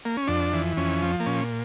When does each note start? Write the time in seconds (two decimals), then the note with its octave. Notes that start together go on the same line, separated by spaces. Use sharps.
0.05 A#3
0.17 C#4
0.28 F2 D4
0.53 E3
0.77 F2 C#4
1.03 F3
1.20 A#3
1.26 A#2 C#4